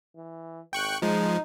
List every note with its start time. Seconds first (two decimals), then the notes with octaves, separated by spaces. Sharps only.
0.16 E3
0.73 G#1 G5 C#6 F#6
1.02 F3 G#3 D#4